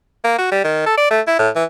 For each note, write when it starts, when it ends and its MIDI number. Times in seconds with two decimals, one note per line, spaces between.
0.24 0.38 58
0.38 0.48 66
0.51 0.64 55
0.64 0.86 51
0.86 0.95 69
0.98 1.08 74
1.11 1.21 57
1.27 1.37 64
1.39 1.50 45
1.56 1.64 52